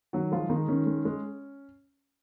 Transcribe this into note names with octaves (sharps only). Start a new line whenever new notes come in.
D#3 F#3 F#4
F3 G#3 F4
D#3 G#3 D#4
D#3 C#4
G#3
G#3